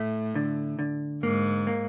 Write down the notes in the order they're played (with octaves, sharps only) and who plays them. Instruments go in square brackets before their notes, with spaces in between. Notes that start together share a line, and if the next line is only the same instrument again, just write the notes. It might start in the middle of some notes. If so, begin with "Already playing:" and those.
Already playing: [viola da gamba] A2 [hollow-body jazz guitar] A3
[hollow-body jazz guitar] D3
D3
[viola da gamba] G#2 [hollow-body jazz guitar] A#3
[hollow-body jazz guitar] A#3